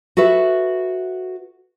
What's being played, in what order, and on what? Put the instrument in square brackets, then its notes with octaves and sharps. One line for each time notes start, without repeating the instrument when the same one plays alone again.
[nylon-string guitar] F#4 A4 B4 E5